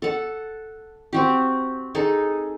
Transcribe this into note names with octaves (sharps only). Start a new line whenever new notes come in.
A4 F#5
C4 F#4 G4
D#4 G#4 A4